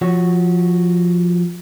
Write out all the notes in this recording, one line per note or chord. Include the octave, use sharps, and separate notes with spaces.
F3 F#4 C#5